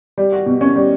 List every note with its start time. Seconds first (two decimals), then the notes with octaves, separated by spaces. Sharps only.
0.18 G3
0.32 F#4
0.46 B2
0.61 C#4
0.76 G3